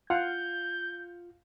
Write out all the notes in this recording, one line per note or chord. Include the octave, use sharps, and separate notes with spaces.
F4 F5 F#5 G6